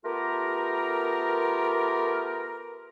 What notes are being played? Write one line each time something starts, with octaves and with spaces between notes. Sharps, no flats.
A3 B3 F4 G4 A#4